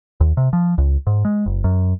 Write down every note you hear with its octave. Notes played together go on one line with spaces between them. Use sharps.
D#2
C3
F3
C#2
G#2
G#3
F#1
F#2